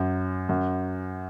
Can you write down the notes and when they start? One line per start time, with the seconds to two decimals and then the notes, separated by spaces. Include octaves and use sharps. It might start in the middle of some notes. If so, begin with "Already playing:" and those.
Already playing: F#2
0.49 F#2